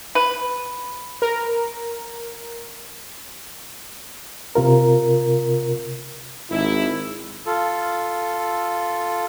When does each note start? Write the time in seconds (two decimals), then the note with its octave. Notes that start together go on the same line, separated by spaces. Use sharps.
0.15 B4
1.22 A#4
4.55 C3 F4 A#4
6.50 G#1 E4
7.46 F4 A4